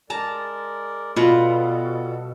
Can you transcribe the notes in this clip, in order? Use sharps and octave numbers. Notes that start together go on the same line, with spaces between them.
G#3 A#4 D5 A5 A#5
B2 G3 B3 F4 A4